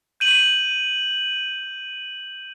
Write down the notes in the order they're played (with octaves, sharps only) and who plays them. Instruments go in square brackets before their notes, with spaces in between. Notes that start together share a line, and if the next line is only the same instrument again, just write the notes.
[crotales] G6 D#7 F#7